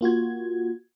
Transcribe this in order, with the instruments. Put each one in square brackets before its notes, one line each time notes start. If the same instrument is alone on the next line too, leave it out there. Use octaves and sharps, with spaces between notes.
[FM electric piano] A#3 F4 F#4 G#6